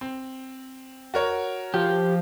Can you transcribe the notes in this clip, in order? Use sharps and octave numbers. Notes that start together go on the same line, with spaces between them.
C4
F#4 A#4 C#5
F3 G4